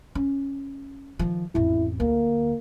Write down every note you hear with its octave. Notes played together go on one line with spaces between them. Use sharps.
C#4
D#3 F3
A1 F2 E4
D2 A#3